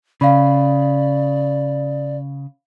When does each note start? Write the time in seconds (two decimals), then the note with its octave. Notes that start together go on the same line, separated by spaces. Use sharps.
0.21 C#3 D5 F5 B5